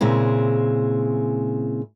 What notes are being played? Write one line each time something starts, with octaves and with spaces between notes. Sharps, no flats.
A#2 C#3 G#3 C4 E4